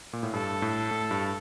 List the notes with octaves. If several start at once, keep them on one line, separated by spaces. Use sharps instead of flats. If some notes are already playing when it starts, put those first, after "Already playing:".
A#2
A2
G2 A4
A2
A2
G2